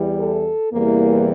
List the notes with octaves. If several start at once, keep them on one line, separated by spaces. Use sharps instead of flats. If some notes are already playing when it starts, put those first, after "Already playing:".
Already playing: E2 E3 G3
A4
E2 C3 E3 G3 A#3